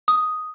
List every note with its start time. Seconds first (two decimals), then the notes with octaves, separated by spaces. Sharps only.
0.08 D#6